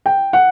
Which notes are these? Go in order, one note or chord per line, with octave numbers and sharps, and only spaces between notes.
G5
F#5